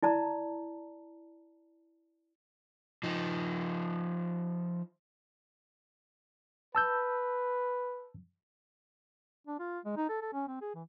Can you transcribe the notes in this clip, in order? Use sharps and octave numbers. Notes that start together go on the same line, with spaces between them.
E4 D5 A5 A#5
F3 D#4
B4 A5 E6 G6
D4
F4
G#3
D#4
A4
A4
C#4
C4
G#4
E3